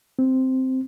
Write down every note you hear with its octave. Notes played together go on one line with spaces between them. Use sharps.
C4